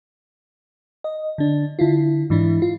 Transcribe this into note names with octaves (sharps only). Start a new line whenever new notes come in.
D#5
D3 D4
D3 E4 F4
G#2 E3 D4 E4
F4